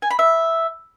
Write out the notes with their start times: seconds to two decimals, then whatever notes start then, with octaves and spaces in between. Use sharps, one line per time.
0.02 G#5
0.11 B5
0.19 E5